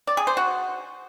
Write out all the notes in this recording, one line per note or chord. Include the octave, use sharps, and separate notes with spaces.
D5
G#4
C5
F#4